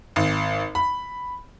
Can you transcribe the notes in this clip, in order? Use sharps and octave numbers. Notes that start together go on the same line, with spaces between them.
G#1
B5